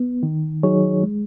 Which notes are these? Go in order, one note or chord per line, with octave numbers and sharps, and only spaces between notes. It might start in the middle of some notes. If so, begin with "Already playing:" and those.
Already playing: B3
D#3
F#3 D#4 G#4 C#5
G#3